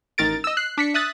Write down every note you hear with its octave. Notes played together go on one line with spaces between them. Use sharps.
A1 D#3 A#4 A6 D7
D#5 E6
F#6 C7
D4 B6 C#7
E5 D#6 F#6 A6 B6